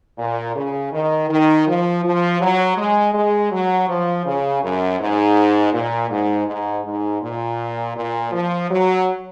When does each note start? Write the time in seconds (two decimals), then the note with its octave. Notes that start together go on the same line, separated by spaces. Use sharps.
0.18 A#2
0.55 C#3
0.92 D#3
1.29 D#3
1.67 F3
2.04 F3
2.40 F#3
2.77 G#3
3.14 G#3
3.52 F#3
3.88 F3
4.26 C#3
4.63 F#2
5.00 G#2
5.73 A#2
6.10 G#2
6.47 G#2
6.84 G#2
7.22 A#2
7.96 A#2
8.32 F3
8.70 F#3